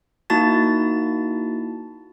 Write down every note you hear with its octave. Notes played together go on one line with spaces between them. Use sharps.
A#3 D#4 E4 F#4 A5 A6